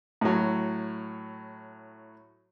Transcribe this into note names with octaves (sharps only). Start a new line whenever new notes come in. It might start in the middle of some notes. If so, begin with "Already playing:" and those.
A2 F#3